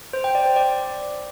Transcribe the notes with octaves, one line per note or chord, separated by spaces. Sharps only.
C5
G5
D5
C5
D5